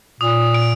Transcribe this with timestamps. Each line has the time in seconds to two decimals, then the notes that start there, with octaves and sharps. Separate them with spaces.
0.20 A#2 D#6
0.54 D7